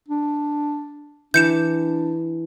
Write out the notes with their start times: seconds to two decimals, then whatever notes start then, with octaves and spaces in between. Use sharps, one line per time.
0.08 D4
1.34 E3 D4 D6 G6 C#7 E7